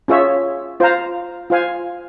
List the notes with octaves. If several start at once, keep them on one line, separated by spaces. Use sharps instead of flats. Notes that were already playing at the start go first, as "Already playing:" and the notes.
C#4 F4 G#4 C#5 E5
F4 C5 F5 A#5
F4 C5 F5 G#5